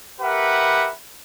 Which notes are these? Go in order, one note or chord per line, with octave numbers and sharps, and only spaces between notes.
G4 A#4 B4 E5 F#5